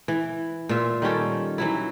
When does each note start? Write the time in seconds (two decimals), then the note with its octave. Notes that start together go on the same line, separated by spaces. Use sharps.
0.08 E3
0.69 A#2 F4 E5
1.02 D#3 G3 C#4 A4
1.58 E3 F#3 E4